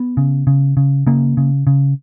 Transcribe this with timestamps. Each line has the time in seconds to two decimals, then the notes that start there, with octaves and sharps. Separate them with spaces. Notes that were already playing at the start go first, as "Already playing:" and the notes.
Already playing: B3
0.17 C#3
0.47 C#3
0.77 C#3
1.07 C#3 A#3
1.37 C#3
1.67 C#3